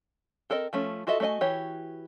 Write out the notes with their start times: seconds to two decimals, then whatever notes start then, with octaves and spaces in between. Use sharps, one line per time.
0.50 C4 A4 A#4 C#5 D#5
0.73 F3 A3 C#4
1.07 F4 F#4 A4 D#5 E5
1.20 A3 F#4 D5 D#5 G#5
1.41 E3 F#4 G4 C#5